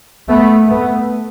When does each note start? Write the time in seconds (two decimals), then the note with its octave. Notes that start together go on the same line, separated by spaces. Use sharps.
0.29 A3 B3
0.68 A3 B3